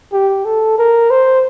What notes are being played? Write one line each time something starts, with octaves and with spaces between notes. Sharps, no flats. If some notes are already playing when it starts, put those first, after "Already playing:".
G4
A4
A#4
C5